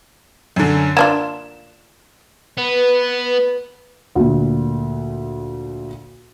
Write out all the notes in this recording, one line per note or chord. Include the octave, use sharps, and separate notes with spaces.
F#2 D3
A#3 D4 F4 E7
B3 B4
D2 A#2